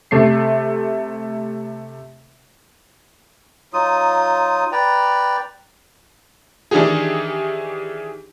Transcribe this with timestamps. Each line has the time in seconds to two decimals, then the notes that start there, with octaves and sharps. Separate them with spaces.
0.11 C3 A3 C7
3.73 F#3 D#4 F4 D#6
4.72 B4 D5 G5 A#5
6.71 D#3 E3 D4 D#4 G4 G#4